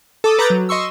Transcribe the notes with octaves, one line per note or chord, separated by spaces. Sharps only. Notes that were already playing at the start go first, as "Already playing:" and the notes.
A4 D6 D#6
B4 A#5 D6 G6 A6
F#3
D#5 C6 C#6 E6